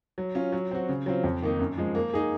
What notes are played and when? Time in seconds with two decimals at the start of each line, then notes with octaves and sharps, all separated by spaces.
0.18 F#3
0.35 C#4 F4
0.52 F#3
0.71 C4 F#4
0.89 C#3
1.06 F#3 C4 F4
1.24 F2
1.43 D#3 A#3 D#4
1.59 F#2
1.78 F3 G#3
1.95 A#3
2.14 D#4 G#4